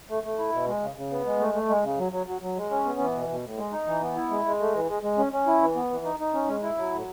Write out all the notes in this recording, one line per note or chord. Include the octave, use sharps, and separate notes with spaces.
A3
A3
E4
B2
G#3
C#3
C#3
B3
G#3
A3
A3
G#3
C#3
F#3
F#3
F#3
F#3
G#3
C#4
B3
E3
B2
B2
A2
G#3
D#4
E3
B3
E4
G#3
G#3
A3
E3
G#3
G#3
C#4
C#4
E4
E3
B3
E3
D#4
D#4
C#4
G#3
E4
F#3
A2